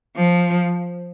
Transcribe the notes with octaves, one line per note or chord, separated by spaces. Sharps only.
F3